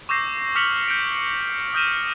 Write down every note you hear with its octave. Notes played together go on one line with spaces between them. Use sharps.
C#6 D6 E6 G6 A#6 C7
D6 F6 B6 C#7 F7 F#7
G6 C#7 D7
D#6 F6 G6 A#6 D#7 E7